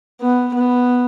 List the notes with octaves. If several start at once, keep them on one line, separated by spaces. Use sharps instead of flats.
B3
B3